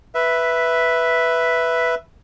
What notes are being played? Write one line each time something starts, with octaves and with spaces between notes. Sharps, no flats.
B4 E5